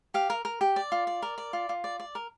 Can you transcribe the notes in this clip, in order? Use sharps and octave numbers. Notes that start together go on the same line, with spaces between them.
G4 F5
A#4
A#4
G4
D5
F4
D5
A#4
D5
F4
F4
D5
D5
A#4